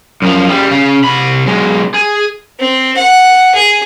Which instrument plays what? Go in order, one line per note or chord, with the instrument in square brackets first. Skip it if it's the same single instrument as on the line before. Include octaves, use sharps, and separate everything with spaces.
[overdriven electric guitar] F#2 F3
C#3 G3
C#3
C3 B5
B1 G#3
G#4
[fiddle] C4
F#5
G#4